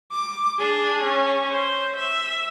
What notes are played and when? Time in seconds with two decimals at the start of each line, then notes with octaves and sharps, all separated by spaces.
0.12 D6
0.58 D4 G#4
1.03 C#4
1.50 C5
1.96 E5